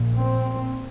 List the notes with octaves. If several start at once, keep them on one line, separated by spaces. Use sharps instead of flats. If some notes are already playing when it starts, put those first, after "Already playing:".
Already playing: A#1 A#2
C4